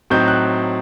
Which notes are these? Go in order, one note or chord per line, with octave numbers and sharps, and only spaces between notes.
A2 F#3 C4 D#4 G6
F#6